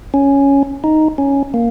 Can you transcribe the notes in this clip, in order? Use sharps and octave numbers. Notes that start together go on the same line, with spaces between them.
C#4
D#4
C#4
A#3